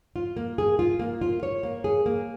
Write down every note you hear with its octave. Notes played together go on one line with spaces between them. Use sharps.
F4
A#3
G#4
F4
A#3
F4
C#5
A#3
G#4
A#3